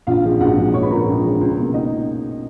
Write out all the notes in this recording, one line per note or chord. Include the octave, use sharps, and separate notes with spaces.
A#1 F4 F5
G#2 F3 G#3
A#1 F#4 F#5
G#2 F3 G#3
A#1 C#5 C#6
B4 B5
G#2 F3 G#3 A#4 A#5
C#4 C#5
A#1
G#2 F3 G#3
C#2
B2 A#3
C#2 D#4 D#5